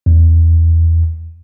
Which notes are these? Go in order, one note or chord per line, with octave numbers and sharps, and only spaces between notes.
E2